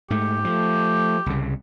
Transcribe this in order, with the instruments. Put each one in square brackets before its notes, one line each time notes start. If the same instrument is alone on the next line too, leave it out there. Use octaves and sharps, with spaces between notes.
[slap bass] G#2 A3 [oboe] G4
[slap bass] F3 [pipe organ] A3
[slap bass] C2 C#3